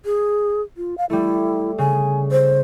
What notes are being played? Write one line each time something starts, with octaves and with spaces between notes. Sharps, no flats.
G#4
F4
F5
G3 A3 E4
C#3 G#5
C5